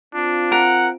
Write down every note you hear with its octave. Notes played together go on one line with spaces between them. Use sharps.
C4 D4 F4
A#4 F#5